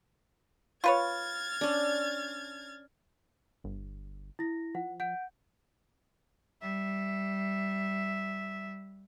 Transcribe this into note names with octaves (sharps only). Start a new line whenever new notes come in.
F4 B4 C#5 F6 G#6 A6
C#4 D4
G1
E4 A#6
F3 F#5
F#5 G6 D7
G3 E5